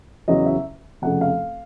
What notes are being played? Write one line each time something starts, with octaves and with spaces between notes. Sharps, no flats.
E2 C#3 F#3 D#5
E5
F1 F2 C#3 F#5
F5